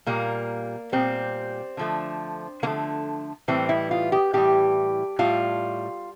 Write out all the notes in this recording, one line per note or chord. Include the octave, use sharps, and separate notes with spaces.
A#2 G3 A#3
A#2 G3 C4
D3 F3 A3
D3 F3 A3 A#3
A2 E3 G3 C4
E4
F4
G4
A2 E3 G3 G4
A2 G3 F4